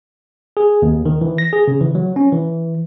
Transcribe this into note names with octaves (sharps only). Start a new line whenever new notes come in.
G#4
D#2
D#3
E3
A#6
G#4
C#3
E3
F#3
C#4
E3